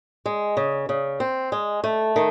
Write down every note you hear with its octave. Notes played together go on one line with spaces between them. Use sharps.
G#3
C#3
C#3
C4
G#3
A3
D#3